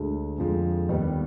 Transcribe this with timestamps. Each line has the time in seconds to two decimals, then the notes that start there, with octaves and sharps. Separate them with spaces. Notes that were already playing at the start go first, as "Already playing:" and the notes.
Already playing: D2 D3 G#3
0.38 F2 D3 F3 G#3
0.89 D#2 D#3 G3 B3 D#4